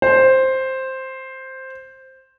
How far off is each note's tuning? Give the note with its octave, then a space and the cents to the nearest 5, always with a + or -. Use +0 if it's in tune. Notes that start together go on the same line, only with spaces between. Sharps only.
C5 +5